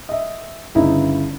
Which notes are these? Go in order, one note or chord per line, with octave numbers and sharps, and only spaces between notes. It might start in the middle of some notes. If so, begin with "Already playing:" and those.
D#5 E5
G1 C#3 D#4 E4